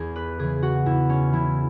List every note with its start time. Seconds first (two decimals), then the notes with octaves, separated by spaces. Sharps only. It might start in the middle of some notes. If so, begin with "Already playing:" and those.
Already playing: E2 G#4
0.16 B4
0.39 C#3 E3 G#4
0.63 F#4
0.86 E2 E4
1.09 C#4
1.33 C#3 E3 E4